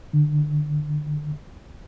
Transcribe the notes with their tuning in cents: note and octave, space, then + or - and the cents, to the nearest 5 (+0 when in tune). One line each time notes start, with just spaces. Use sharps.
D3 +25